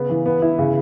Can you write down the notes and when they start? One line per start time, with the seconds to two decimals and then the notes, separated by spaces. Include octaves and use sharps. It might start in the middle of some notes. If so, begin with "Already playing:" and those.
Already playing: C#3 B3
0.09 E3
0.26 B3
0.42 E4
0.59 C#3